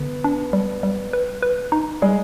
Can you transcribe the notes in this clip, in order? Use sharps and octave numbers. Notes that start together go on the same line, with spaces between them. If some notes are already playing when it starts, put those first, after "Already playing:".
Already playing: D3 B3
D4
G3
G3
B4
B4
D#4
G3 G#3 G#4